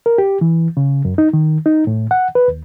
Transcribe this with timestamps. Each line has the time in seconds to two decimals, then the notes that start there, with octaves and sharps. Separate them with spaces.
0.06 A#4
0.18 G4
0.41 E3
0.77 C#3
1.05 F#2
1.18 D#4
1.33 D#3
1.66 D#4
1.87 A2
2.11 F#5
2.35 B4
2.48 D#2